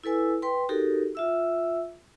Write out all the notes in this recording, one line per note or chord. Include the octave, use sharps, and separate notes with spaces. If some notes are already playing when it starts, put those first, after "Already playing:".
E4 A4 B4 G#5 E6
B4 G5 C6
D#4 F#4 G4 A4 A#4
F4 E5 E6